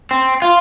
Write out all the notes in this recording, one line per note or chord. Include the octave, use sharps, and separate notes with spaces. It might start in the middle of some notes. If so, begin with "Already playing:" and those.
C4
F4